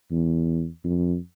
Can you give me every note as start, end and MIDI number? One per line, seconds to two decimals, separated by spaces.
0.11 0.68 40
0.84 1.17 41